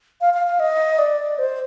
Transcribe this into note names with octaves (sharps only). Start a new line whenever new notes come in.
F5
F5
F5
D#5
D5
C5